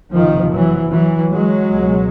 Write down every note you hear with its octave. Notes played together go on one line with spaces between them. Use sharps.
F#1 F2 C3 D#3 F3
E3 F#3
E3 F#3
F#3 G#3
C#2 B2